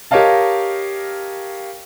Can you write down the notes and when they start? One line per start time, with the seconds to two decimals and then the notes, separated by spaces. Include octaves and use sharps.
0.11 G4 A#4 C#5 D#5 F5 A5